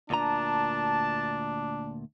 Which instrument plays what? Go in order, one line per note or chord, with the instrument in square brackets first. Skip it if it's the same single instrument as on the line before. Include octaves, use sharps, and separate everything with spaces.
[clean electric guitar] D2 A#2 A#5 [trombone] D4 [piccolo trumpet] A5